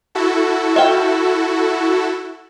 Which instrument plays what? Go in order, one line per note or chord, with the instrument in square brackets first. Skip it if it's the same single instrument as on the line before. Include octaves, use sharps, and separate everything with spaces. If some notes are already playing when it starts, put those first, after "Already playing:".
[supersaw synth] E4 F#4 A4
[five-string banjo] E5 F5 G5